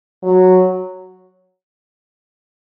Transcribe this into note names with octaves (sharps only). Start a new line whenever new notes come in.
F#3